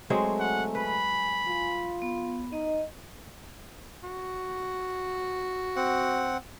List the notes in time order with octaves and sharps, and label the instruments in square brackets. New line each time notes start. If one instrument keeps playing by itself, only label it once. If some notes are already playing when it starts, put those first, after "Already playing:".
[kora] F#3 G#3 C4 [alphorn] A3 [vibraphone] G#5
[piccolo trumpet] F#5
[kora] B4 [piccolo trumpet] B5
[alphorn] F4
[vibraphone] B3
[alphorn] D#4 [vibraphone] D#5
[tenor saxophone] F#4
[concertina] C4 F#5